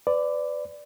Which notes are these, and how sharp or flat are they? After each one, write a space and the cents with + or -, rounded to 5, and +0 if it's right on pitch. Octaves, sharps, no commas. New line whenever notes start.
B4 +30 D5 +0